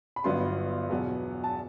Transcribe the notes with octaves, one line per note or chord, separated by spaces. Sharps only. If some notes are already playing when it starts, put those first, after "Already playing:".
B5
G1 G2 F#3 B3 C6
E2 B2 F#3 B3
A5